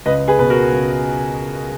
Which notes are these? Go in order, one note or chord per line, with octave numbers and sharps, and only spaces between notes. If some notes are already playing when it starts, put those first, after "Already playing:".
C#2 B4 D#5
G#4 B4
B2 B4
F#4 A#4
C#2